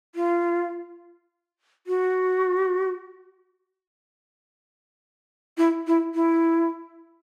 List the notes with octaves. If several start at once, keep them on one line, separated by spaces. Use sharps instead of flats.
F4
F#4
E4
E4
E4